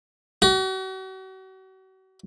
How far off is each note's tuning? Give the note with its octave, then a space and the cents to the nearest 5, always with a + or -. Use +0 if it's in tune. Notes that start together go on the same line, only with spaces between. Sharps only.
F#4 +40